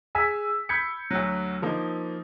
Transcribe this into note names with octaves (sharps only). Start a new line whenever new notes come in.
G#4 G#5 E6 B6
B5 G6 G#6 B6 C#7
D2 F#3
F3 A#3 D#4